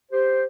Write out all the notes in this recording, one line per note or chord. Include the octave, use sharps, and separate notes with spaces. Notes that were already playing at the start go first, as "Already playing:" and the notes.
G4 C5